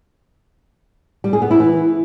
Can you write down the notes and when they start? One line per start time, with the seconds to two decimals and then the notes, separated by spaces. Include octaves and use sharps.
1.24 G3
1.33 G#4
1.42 B3
1.51 E4
1.59 E3